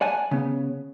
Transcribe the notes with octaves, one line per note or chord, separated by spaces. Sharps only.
D5 F#5 G#5 A5
C#3 B3